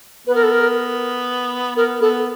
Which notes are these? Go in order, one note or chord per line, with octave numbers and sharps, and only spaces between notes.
B3 B4
A#4
A4
A#4
B3 A#4
B3 A4